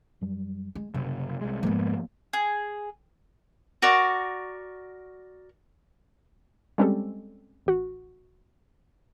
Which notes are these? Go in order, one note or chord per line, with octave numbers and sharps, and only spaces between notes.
F#2 F#3 G3
G#3
F#1 C3 G3
C2 G#3
F1 G#2 F3 G#3 A#3 B3
G#4
F#4 A#4 D5 C#6
G3 G#3 C4 C#4 G4 A4
A1 F#4